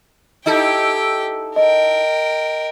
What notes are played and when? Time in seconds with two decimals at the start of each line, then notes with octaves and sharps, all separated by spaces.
0.46 D#4 E4 G4 A4 G5
1.56 A#4 D#5 G5